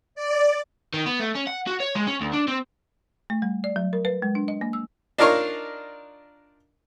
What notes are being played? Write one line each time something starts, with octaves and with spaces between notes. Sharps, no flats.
D5
D#3
B3
A3
C#4
F#5
F#4
C#5
G#3
C#4
D2
D4
C4
A3
G3
D5
F#3
A#4
B4
G#3
D4
D#5
A#3
E6
D4 D#4 F4 A#4 C#5